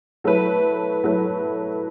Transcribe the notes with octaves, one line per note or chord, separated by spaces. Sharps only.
F#3 A3 E4 B4
F#3 A3 E4 B4